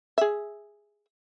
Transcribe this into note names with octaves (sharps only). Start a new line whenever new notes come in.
G#4 E5